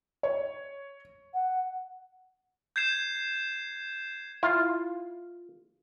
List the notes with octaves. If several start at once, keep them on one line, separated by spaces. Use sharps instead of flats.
C#5
F#5
G6 G#6 C7 E7
E4 F4